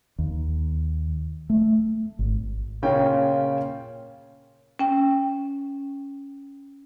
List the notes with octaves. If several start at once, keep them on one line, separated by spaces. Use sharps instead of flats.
D#2
A3
G#1
A#2 C#3 C#4 F4 G5
C#4 G5